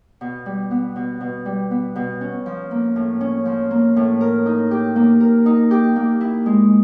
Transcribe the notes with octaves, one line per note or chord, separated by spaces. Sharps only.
B2
G3
B3
B2
B2
G3
B3
B2
C#4
F3
A#3
A2
C#4
F3
A#3
A2
A#4
D#4
G4
A#3
A#4
D#4
G4
A#3
E4
G#3